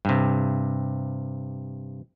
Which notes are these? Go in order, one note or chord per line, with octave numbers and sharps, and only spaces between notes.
G2 C3